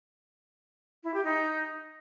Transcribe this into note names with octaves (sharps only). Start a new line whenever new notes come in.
E4
G4
D#4